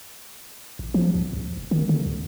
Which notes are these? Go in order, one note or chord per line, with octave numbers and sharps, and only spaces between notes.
A1
F3
C#2
C#2
F1
D#3
D3
C#2